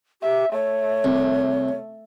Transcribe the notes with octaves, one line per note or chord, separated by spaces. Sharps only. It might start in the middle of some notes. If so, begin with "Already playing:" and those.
G4 E5
A3 C#5
C2